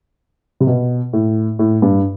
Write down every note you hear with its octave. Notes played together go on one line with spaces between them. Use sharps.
C3
B2
A2
A2
G2